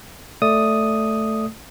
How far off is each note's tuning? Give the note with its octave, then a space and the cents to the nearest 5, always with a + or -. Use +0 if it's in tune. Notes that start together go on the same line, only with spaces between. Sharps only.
A3 +0 D5 +0 D#6 +0